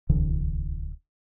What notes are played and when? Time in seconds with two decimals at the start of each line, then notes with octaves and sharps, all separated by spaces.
0.09 D1 C2 D3 E3